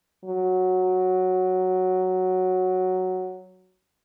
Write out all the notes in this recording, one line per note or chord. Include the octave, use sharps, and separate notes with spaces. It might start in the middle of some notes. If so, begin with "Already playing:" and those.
F#3